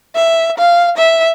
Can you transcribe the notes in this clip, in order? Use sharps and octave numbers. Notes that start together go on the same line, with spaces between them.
E5
F5
E5